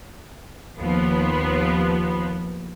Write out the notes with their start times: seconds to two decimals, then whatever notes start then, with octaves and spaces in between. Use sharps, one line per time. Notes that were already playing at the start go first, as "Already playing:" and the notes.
0.79 D#2 F3 B3